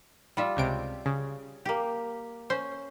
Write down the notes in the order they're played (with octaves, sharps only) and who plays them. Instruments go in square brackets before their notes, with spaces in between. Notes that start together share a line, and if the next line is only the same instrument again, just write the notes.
[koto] G3 F4 E5
[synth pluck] C#2 C3 D7
C#3
[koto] A#3 G4
[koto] C#4 [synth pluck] C5